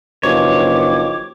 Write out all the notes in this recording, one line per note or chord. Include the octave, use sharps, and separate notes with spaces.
F#1 G2 D#3 F3 C#5 D6